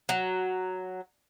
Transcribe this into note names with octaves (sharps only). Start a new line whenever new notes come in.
F#3